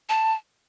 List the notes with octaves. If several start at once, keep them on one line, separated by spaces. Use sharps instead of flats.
A5